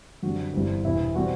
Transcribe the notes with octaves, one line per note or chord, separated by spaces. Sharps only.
F#2 D3 G3 C4 F#4
G1 G2 E3 G3 C4
E1 E2 C3 E4
B2 G3 C4 F#4